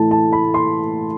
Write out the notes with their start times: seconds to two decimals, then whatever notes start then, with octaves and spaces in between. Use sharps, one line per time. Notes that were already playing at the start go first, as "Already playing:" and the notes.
Already playing: A2 E3 A3 E4 A5
0.11 A5
0.33 B5
0.54 C6